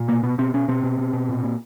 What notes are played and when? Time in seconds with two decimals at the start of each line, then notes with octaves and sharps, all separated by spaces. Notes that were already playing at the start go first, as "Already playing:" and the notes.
Already playing: A#2
0.08 B2 A#3
0.23 B2 B3
0.38 B2 C4
0.54 B2 C#4
0.68 B2 C4
0.83 B2
0.99 B2
1.13 B2
1.29 A#2
1.44 A#2